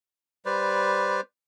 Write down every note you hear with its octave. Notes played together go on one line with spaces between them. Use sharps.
G3 B4 C5 D5